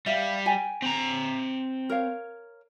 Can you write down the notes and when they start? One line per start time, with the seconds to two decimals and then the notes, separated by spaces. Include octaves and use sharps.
0.06 G3 E5 F5
0.46 G5 G#5
0.82 C4 A#5
1.90 A#4 C#5 F5